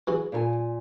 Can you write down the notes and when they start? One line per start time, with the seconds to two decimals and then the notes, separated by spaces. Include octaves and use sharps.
0.07 E3 F#4 G#4
0.32 A#2 A#4 G#5